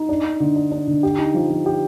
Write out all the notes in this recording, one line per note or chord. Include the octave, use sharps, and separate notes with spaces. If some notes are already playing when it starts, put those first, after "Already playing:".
Already playing: D#4
D4
D4
D3
D4
D4
D3
G4
D#4
F3
F3
G4